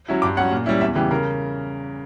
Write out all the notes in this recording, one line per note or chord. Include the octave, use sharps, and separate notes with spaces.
F#3 C#4 E4
G2 D6
F#3 C#4 F#5
A#2
G3 C#4 E4
E2 E5
C#3 E3 G3 G4
C#3 A#4